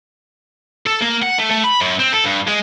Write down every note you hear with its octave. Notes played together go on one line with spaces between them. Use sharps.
A4
A#3
F#5
A3
A3
B5
F#2
C4
A4
G2
G#3